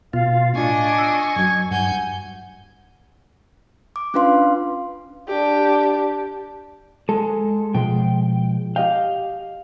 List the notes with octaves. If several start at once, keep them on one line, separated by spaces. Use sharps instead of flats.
B2 F4 F5
A2 D4 F4 D#5 G#5 C#6
E6
F#2 F#3 G#6
G2 F#5 G#5 G6
D6
C#4 D4 F4 B4 F5 C6
D4 G4
G#3 A4
B2 F3 G#3 G5
G4 D#5 F5 G5